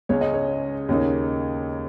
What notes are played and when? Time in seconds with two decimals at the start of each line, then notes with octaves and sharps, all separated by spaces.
0.09 C#2 C#3 G#3 C#4 C#5
0.21 D#5
0.34 C#5
0.89 D#2 C#3 A#3 D#4 C#5